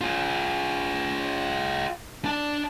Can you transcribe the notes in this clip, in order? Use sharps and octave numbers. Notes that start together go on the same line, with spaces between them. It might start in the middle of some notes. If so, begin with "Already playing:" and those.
F4 G#4
D4 A5